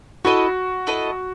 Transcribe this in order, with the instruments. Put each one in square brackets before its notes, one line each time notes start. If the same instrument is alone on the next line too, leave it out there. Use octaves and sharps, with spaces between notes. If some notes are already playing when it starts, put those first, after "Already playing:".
[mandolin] E4 A4 D#5 [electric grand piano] F#4
[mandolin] E4 A4 D#5